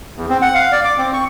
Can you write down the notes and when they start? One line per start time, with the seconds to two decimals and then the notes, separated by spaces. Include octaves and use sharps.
0.16 E2
0.29 C4
0.42 F#5
0.55 F5
0.72 D5
0.85 D6
0.98 C4
1.14 C#6